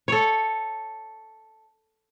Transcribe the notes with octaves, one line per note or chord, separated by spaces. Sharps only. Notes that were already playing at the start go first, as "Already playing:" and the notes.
A4 C#5